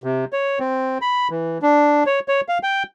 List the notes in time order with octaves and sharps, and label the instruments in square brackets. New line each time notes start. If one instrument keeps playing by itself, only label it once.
[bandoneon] C3
C#5
C4
B5
E3
D4
C#5
C#5
F5
G5